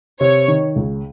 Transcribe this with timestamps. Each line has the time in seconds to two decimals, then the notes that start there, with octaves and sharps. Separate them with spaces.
0.20 C3 C#5
0.48 D#3
0.76 C#2